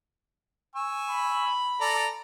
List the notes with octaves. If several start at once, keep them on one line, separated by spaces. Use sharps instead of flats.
G#5 C#6 E6
B5
A4 D5 A#5